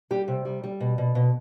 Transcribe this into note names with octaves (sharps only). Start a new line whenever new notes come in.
G3 G4
C3
G3
G3
B2
B2
B2